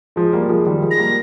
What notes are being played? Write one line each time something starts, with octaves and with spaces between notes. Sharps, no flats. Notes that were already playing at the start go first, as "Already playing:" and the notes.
F3 G#3
G3 A#3
F3 G#3
D#3 G3
F3 G#3
A#6
G3 A#3